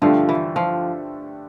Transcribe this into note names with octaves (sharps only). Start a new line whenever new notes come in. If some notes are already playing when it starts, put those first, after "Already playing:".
G2 D3 F3 A3 D4 G4
E3
F3